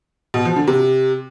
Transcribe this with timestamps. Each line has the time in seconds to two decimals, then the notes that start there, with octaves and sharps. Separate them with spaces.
0.34 B2
0.45 F3
0.56 D3
0.67 C3